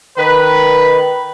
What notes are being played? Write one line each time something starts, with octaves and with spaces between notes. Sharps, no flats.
D#3 B4